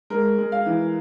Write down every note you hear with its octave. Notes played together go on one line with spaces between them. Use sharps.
G#3 A#4
G#3
F5
E3